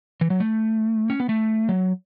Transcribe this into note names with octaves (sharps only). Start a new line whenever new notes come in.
E3
F#3
A3
C#4
B3
A3
F#3